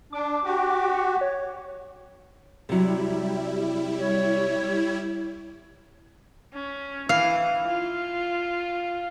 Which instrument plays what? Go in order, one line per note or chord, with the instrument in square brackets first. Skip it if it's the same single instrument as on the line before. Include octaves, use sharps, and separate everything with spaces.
[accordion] D4 [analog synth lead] D6
[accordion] F#4 G4
[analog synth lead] F#5
C#5
[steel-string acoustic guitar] C3 F#3 [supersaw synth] G3 E4
[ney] C#5
[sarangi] C#4
[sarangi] E3 [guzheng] F5
[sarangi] F4